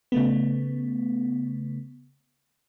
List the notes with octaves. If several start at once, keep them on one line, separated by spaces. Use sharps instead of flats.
C#3 A3 B3